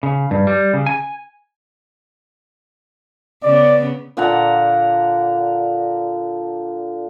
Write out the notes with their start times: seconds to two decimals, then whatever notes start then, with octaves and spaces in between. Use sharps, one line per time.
0.03 C#3
0.31 G2
0.47 G3
0.74 C#3
0.86 G#5
3.43 C#3 B3 D5
4.17 A#2 D3 F#5 A#5